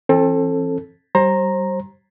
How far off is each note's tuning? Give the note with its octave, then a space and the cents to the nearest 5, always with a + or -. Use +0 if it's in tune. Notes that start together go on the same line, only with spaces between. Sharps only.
E3 +25 C4 +35 A4 +0
G3 -30 C5 +30 A#5 +0